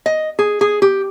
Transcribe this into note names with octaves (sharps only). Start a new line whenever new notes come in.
D#5
G#4
G#4
G4